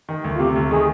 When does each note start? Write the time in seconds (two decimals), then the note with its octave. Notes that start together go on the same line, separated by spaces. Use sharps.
0.09 D#3
0.24 D2
0.36 F4
0.39 C3 G4
0.56 D2
0.71 D#3 G#4